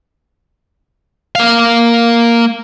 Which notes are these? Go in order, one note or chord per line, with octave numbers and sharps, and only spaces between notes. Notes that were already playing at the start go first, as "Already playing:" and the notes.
A#3 F5